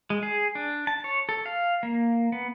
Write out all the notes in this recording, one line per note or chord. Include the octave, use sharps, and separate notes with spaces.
G#3
G#4
D4
A5
C#5
A4
F5
A#3
B3